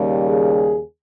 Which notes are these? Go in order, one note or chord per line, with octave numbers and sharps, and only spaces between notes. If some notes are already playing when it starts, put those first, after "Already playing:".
Already playing: D#2 C#3 G3
G#4